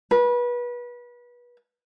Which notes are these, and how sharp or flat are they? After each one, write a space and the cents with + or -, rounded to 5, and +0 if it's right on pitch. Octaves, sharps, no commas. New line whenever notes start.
B4 -30